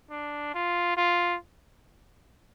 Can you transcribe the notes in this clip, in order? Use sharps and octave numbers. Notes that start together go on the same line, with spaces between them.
D4
F4
F4